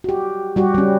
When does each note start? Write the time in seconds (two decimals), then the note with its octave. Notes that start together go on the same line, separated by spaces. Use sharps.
0.04 F#4 G4
0.56 G3 F#4 G4
0.74 G3 C#4